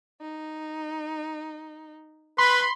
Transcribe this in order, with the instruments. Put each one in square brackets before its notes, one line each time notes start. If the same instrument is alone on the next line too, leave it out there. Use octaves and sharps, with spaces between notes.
[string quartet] D#4
[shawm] B4 [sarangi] B5 [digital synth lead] C6